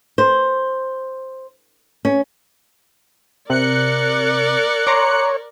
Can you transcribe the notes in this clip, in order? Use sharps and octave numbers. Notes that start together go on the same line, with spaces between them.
C5
C#4
C3 A#4 D5 F#6 C#7
C#5 A#5 C6 D6